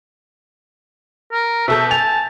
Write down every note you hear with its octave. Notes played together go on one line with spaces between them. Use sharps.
A#4
B2 A4 E5 G6
G#5 A5 F7